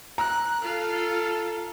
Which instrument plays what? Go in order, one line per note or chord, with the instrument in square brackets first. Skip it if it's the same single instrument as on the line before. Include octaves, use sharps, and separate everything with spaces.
[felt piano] A#5 [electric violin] F#6
[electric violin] F4 F5 [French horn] A4